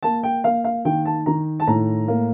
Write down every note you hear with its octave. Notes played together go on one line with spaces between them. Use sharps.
A#3 A5
G5
A#3 F5
F5
D#3 G5
A5
D#3 A#5
A5
A2 A#5
A#3